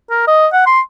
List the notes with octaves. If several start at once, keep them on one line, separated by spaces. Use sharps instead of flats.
A#4
D#5
F#5
C6